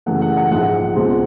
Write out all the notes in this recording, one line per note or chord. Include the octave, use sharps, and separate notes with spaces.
F#2 C#3 E3 A3 F#5
F#5
F#5
A#1 G#2 F3 G#3 F#5
C#2 B2 G#3 C4